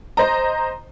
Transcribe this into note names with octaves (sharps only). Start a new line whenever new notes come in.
C5 D#5 A#5